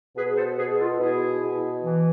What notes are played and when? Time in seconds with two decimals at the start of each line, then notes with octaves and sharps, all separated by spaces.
0.16 B2 G#4 B4
0.37 A4 C5
0.58 B2 G#4 B4
0.79 F4 A4
0.99 B2 E4 G#4
1.41 B2
1.82 E3